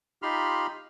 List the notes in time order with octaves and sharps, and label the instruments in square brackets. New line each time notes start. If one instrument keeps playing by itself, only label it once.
[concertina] D#4 F4 G4 B5 C6 F6